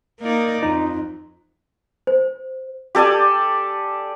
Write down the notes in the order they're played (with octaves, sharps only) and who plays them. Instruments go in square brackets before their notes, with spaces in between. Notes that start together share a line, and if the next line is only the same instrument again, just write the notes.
[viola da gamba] A#3 D#4 D5
[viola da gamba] F2 [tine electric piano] D#4
[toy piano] C5
[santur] G4 A4 D5 G#5